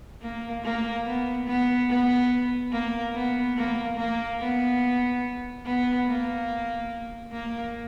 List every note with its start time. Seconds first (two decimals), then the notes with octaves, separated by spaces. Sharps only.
0.22 A#3
0.64 A#3
1.06 B3
1.46 B3
1.89 B3
2.72 A#3
3.15 B3
3.56 A#3
3.97 A#3
4.40 B3
5.65 B3
6.07 A#3
7.32 A#3